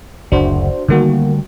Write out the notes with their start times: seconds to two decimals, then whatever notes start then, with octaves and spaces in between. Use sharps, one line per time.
0.32 F#1 D2 D4 F#4 C5
0.88 D3 D#3 G3 A3 A#3 F#4